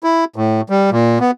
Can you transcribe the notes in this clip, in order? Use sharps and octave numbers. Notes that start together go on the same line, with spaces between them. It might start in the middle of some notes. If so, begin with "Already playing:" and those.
E4
A2
G3
A#2
B3